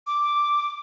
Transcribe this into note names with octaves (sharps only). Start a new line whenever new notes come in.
D6